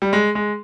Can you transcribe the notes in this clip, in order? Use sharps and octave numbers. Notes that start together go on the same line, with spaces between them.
G3
G#3
G#3